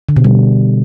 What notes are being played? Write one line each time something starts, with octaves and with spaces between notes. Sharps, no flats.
D3
B2
G3